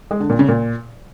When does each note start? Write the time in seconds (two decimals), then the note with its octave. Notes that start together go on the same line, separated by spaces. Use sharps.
0.11 G#3
0.20 D3
0.30 A#2
0.39 C#3
0.48 A#2